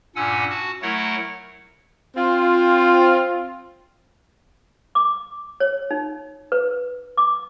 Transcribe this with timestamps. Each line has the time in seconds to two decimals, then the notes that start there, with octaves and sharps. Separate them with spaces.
0.16 G2 A#2 C#4 F#5 G#5 E6
0.50 F#4 A5
0.82 F#3 A3 E4 A#4 C#5 F#5
2.16 C4 F4
4.95 D6
5.60 C#5
5.91 D#4
6.52 B4
7.17 D6